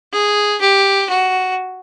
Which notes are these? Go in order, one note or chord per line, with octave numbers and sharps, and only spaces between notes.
G#4
G4
F#4